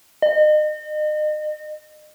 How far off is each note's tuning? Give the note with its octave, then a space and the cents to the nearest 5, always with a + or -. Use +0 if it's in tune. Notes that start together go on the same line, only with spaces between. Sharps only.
D#5 -35